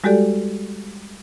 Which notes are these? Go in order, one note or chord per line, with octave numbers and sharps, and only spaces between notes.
G3 G#3 F#4 G4 A4 D5